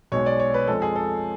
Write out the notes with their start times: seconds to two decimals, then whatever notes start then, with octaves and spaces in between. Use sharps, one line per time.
0.12 B1 B2 G#3 C#5
0.26 D5
0.40 C#5
0.54 B4
0.67 F2 F3 G#3 A4
0.82 G#4
0.96 A4